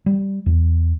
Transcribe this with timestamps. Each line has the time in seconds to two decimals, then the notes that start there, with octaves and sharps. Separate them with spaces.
0.06 G3
0.46 E2